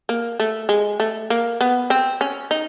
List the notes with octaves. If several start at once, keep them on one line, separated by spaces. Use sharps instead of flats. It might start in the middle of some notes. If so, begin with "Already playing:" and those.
A#3
A3
G#3
A3
A#3
B3
C4
C#4
D#4